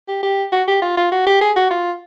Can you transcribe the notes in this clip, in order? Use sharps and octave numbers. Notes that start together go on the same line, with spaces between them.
G4
G4
F#4
G4
F4
F4
F#4
G4
G#4
F#4
F4